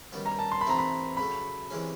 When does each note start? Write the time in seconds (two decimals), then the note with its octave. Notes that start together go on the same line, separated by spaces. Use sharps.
0.12 F#2 D#3 G3 B3
0.26 A#5
0.39 A5
0.52 C6
0.61 B5
0.66 C3 E3 A3 C4 D#4 A#5
0.78 B5
1.17 C#3 F#3 A3 B5
1.70 C3 E3 G#3 C#4